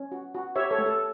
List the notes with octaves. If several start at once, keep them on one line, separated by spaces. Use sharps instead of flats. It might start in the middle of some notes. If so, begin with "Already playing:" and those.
Already playing: C#4
F#4
F#4
G4 C#5 E5
A4 C#5
A3
A4